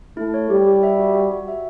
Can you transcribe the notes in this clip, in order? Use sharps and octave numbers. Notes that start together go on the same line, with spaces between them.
A3 E4
C#5
G3 G4
G4
E5
F#4
F#4
F#4
E5